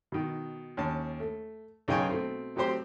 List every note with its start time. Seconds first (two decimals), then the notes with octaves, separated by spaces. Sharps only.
0.12 B2 D#3
0.77 D#2 C#4 A5
1.20 A3
1.88 B1 C#3 D#4 G5 G#5 C#6
2.09 B2 A3 C4
2.56 A2 F#3 C4 G4 C5 C6